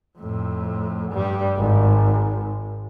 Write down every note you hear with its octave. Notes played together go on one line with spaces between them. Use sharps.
F2 A2
G2 G3
G#1